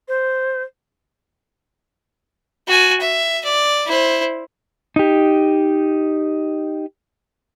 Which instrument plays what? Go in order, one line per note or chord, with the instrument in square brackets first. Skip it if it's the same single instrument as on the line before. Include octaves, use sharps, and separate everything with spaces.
[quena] C5
[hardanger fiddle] F#4 G#5
E5
D5
E4 C5
[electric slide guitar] D#4 G4